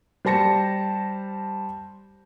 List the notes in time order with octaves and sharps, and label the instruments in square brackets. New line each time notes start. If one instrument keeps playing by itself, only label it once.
[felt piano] G3 C5 A5 A#6 C#7